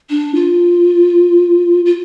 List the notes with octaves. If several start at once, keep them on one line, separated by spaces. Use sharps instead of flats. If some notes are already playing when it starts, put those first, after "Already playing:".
D4
F4
F4